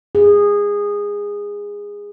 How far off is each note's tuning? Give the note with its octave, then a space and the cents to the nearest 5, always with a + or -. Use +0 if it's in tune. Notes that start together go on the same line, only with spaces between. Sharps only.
G#4 -20